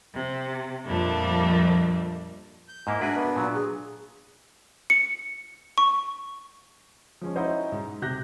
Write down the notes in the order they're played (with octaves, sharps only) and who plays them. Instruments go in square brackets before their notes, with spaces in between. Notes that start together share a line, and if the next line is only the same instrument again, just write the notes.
[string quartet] C3
F2 A#2 F3 G3 A3 D4
[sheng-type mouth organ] G6
[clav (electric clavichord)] G#2 A#3 E4
[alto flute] D4 [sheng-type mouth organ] F#4 A#4 E5 [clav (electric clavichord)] G#4 B4 D5
[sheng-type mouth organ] B3
[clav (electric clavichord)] A#2 F#3
[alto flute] G#4
[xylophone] C#7
C#6
[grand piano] F3 G#3 C#4
C#4 D#4 E4 F#4 C5 D#5
G#2
C3 F#6 G6 A#6